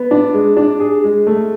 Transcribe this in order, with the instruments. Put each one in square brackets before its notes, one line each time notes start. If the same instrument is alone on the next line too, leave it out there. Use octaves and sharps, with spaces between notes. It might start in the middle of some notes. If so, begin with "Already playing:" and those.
Already playing: [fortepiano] B3
D4
G#3
D4
G#4
G#3
A3